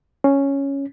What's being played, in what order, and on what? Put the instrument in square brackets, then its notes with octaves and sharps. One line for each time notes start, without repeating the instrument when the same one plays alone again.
[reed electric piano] C#4